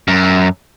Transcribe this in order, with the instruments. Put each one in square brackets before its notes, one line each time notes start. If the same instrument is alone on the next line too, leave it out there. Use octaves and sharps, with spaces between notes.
[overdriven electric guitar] F#2